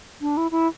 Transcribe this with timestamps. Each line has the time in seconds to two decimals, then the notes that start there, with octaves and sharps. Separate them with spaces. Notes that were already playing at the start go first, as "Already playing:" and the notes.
0.21 D4
0.37 E4
0.51 E4